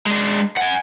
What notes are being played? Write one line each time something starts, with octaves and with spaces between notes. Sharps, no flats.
G#3 D4
F#5 G#5